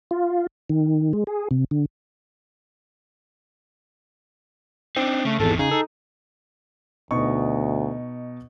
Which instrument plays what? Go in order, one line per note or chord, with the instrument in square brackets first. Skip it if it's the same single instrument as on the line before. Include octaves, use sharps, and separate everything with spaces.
[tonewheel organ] F4
D#3
G#3
G#4
C3
D3
[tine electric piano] C4 [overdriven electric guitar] D4 D#4
[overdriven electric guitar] C#3 [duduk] A3
[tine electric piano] G#1 E2 [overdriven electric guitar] D#3 E3 [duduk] A4
[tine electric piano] C#3 [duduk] D#4 [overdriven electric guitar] G#4
[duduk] D#4 [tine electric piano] A4
[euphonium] D2 [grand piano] B2 D#4 C#6